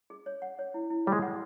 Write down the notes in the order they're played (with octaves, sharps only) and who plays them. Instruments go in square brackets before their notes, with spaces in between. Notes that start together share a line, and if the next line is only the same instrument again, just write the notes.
[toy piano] G#4
C#5
F#5
C#5
E4
E4
[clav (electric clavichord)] G3 [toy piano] C#5
[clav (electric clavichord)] G#3
[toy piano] F#5